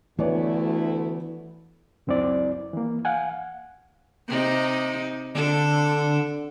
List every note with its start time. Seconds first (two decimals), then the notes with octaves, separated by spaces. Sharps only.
0.19 D2 E3 A3 B3 E4 C#5 D5
2.07 C#2 F#2 C4 E4 D5
2.73 E3 A#3
3.05 F5 F#5 G#5
4.28 C3 D#4
5.35 D3 D4 A4